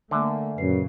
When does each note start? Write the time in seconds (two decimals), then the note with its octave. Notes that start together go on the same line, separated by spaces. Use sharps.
0.11 D3 A3 A#3 D5 E5 G#5
0.57 F#2 A#2 C#3 B4 C7